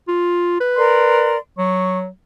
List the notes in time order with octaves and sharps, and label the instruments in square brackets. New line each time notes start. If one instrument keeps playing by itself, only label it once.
[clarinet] F4
B4
[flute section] A#4 D5 C6
[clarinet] F#3 [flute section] C#6